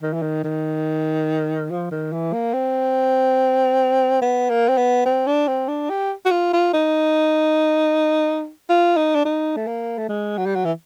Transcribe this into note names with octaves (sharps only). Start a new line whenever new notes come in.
D#3
E3
D#3
D#3
F3
D#3
E3
A#3
C4
B3
A#3
C4
B3
C4
D4
C4
D4
G4
F#4
F4
F4
D#4
F4
D#4
D4
D#4
A3
A#3
A3
G#3
F#3
G3
F#3
E3